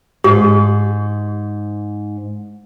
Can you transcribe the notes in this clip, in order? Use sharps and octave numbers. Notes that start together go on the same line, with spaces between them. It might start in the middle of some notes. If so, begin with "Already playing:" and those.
G#2 G4